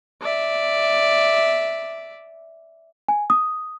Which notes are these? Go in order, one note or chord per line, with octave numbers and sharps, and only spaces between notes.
D5 E5
G#5
D#6